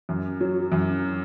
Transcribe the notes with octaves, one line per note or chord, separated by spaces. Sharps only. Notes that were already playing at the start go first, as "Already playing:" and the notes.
F#2
F#3
F#2